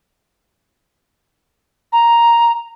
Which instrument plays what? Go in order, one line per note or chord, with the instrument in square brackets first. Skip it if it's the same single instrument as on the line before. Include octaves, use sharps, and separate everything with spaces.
[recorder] A#5